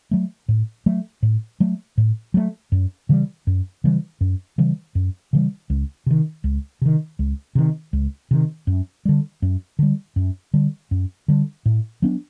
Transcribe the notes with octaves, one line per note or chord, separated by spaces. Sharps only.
F#3 A3
A2
F#3 A3
A2
F#3 A3
A2
F#3 A3
F#2
C#3 E3 G3
F#2
C#3 E3 G3
F#2
C#3 E3 G3
F#2
C#3 E3 G3
C#2
C3 D#3
C#2
C3 D#3
C#2
C3 D#3
C#2
C3 D#3
F#2
D3 G3
F#2
D3 G3
F#2
D3 G3
F#2
D3 G3
A2
F#3 B3 D4